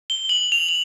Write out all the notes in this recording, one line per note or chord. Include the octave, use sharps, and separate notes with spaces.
G7
F#7
F7
F7